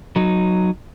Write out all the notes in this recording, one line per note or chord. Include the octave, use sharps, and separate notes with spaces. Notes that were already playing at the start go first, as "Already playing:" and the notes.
F#3 D#4